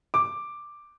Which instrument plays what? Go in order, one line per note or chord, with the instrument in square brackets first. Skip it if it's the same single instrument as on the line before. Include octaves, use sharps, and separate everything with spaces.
[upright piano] D6